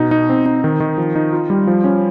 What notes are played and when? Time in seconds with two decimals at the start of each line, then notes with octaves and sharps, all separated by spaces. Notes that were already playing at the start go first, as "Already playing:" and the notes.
Already playing: B2 D#4
0.11 D#4
0.29 C4
0.46 D#4
0.64 D#3
0.80 D#3
0.97 F3
1.15 D#4
1.33 F4
1.50 G3
1.67 F3
1.84 C#4